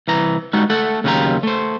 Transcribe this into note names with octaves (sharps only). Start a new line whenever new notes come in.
C2 E3 A#5
G3 G#3 D#4 F#4
A3 A4 F#5
D#2 C#3 F#3 F4 G4 A#5
A3 C5